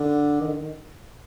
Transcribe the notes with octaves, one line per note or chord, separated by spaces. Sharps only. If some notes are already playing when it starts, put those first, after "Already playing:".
Already playing: D3
D#3
D3
D#3